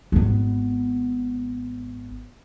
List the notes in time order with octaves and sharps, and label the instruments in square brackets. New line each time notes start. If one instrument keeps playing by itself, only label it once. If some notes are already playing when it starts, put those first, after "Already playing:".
[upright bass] G#1 B3